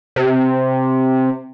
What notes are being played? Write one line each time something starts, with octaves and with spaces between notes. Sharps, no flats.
C3